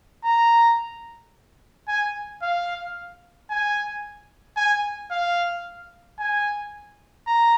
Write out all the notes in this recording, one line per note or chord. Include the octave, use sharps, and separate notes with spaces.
A#5
G#5
F5
G#5
G#5
F5
G#5
A#5